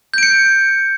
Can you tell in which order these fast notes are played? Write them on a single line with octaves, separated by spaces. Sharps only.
G6 D7 C#7